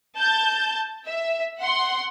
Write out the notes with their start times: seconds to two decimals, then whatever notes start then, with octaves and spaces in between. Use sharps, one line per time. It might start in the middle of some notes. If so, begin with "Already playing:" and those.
0.17 A5 G6
1.06 E5
1.62 F#5 C6